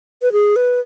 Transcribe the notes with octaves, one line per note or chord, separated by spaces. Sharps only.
B4
G#4
B4